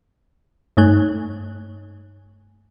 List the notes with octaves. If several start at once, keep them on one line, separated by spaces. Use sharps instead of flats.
G2 A3 D#4 C#5 G#5 F#6